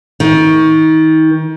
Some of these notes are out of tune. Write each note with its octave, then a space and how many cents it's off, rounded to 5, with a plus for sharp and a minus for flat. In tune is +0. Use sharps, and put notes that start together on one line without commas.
D#3 +30